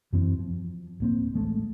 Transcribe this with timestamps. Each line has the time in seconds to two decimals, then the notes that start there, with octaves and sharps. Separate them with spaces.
0.13 F#2 E3 C4
0.39 F3
1.00 D1 A#3 C4
1.34 A1 G#3 A3